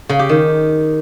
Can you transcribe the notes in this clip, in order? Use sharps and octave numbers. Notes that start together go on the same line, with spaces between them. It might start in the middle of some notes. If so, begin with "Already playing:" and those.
C#3
G4
D#3